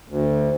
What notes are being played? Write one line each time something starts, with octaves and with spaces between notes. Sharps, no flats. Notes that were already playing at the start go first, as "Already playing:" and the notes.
D2